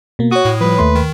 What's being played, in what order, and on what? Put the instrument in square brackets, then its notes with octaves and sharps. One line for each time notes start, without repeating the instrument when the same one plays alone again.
[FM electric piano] B2 A#3
[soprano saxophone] F#4 [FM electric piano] C#5 D#6
[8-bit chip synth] A2
[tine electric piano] F3 G3 [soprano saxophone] B4
[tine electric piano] D#2 A3 C6
[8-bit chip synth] D#3